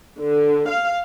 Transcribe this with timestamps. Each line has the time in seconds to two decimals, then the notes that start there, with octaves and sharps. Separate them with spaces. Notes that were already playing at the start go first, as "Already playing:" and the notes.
0.19 D3
0.68 F5